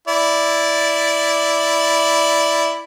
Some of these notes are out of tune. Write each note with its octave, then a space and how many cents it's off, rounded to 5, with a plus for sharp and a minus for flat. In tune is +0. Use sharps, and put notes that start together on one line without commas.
E4 +0 D5 -5